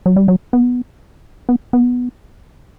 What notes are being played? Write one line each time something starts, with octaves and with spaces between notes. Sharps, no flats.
F#3
G3
F#3
B3
B3
B3